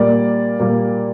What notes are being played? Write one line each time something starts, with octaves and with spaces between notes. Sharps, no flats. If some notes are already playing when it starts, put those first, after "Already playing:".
Already playing: A#2 G3 A#3 D5
A#2 G3 A#3